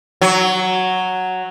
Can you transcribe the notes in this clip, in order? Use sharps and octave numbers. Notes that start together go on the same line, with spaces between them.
F#3